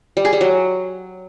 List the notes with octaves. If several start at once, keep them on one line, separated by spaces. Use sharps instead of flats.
G3
G#4
G3
F#3